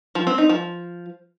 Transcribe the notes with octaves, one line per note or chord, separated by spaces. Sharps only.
F3
C4
D#4
F3